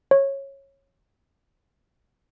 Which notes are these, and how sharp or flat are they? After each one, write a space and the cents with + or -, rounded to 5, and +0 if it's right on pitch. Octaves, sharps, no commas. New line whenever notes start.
C#5 -15